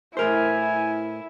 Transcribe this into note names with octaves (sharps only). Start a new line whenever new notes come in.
A2 E4 A#4 C5 G#5